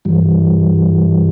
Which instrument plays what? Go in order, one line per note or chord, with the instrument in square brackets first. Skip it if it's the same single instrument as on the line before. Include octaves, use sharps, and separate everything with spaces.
[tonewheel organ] G2 E3 G3